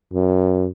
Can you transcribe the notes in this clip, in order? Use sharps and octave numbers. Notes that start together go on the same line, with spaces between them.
F#2